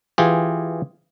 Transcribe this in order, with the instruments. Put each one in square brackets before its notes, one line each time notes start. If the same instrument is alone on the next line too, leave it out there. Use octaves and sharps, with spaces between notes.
[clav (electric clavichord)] E3 F4 G4 G#4